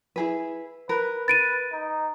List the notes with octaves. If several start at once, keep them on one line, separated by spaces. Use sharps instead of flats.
E4 G#4 B4
A#4 B4
B4 A6 D7 D#7
D#4